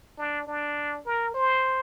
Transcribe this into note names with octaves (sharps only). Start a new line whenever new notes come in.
D4
D4
A#4
C5